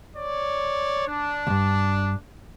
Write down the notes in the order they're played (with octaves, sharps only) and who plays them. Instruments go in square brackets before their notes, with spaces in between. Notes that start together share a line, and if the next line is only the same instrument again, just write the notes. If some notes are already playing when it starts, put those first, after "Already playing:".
[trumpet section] C#5 D5
D4
[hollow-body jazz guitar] D2 G2